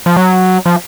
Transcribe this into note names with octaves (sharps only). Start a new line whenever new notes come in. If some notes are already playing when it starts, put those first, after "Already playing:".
F3
F#3
F3